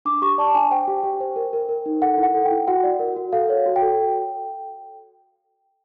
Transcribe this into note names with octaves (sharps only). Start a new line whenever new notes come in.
D4 D6
G4 C#6
D5 A5
D4 G#5
C5 G5
G4
G4
C5
A#4
A#4
A#4
D#4
A4 F#5
E4
F#5
A4
G5
E4
F#4 F#5
D5
A#4
F#4
A4 F5
C#5
F#4
G5
A4